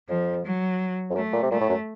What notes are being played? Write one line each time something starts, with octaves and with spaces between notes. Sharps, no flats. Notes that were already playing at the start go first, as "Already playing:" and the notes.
F2 F3
F#3
F2
F#2 A3
A#2
C3
A#2 A3
A2
F#2